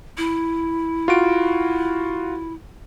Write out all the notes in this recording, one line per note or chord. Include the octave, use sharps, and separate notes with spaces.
E4
F4 F#4 D7